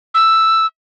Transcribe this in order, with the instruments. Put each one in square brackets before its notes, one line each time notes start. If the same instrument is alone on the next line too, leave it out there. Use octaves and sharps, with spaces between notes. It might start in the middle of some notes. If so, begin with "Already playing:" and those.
[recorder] E6